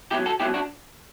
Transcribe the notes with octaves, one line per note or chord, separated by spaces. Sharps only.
C#2 B2 F#3 E4 G4
F#4 A4
C#2 B2 F#3 E4 G4
D4 F#4